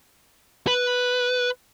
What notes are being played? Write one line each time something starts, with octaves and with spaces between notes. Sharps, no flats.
B4